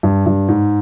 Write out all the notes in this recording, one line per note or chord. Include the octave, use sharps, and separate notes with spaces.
G2
G2
G#2